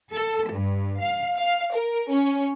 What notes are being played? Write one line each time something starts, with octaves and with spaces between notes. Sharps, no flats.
A4
G2
F5
F5
A#4
C#4